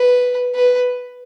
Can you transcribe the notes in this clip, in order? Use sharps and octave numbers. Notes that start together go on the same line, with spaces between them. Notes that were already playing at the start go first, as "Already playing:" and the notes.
Already playing: B4
B4